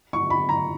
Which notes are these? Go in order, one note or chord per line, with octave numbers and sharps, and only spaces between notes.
C#6
B5
A#5